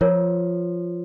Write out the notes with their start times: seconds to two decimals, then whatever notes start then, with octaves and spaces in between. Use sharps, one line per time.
0.01 F3 F4 A#4 C#5